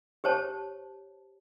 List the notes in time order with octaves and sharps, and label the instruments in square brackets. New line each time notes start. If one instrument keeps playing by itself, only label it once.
[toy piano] G4 C5 C#5 A5